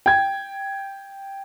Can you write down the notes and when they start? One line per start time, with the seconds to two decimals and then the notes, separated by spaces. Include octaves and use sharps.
0.06 G5 G#6